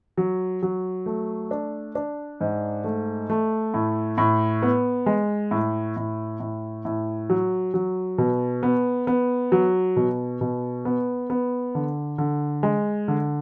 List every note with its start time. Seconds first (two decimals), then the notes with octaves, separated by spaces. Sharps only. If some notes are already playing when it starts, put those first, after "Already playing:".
0.17 F#3
0.63 F#3
1.06 A3
1.51 D4
1.95 D4
2.41 G#2
2.84 A3
3.30 A3
3.74 A2
4.18 A2
4.62 B3
5.06 G#3
5.51 A2
5.97 A2
6.40 A2
6.85 A2
7.30 F#3
7.74 F#3
8.18 B2
8.63 B3
9.07 B3
9.52 F#3
9.96 B2
10.41 B2
10.85 B3
11.30 B3
11.75 D3
12.18 D3
12.63 G#3
13.08 D3